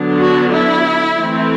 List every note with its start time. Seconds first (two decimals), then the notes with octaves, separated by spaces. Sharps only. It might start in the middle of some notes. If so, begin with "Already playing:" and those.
Already playing: D3 F#3 B3 D4
0.21 F#4
0.54 E4
1.17 E3 A3 C4